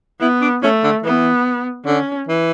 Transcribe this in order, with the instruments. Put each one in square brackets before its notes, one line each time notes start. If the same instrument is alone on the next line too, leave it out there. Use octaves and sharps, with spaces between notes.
[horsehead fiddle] B3 [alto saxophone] E4
[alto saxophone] D4
[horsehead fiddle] A3 [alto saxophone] C#4
[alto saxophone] D3
[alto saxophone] E3 [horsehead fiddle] B3
[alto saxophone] D3 [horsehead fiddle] C#4
[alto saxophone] E3